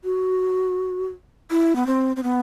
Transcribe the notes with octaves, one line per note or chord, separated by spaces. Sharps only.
F#4
E4
B3
C4
C4
B3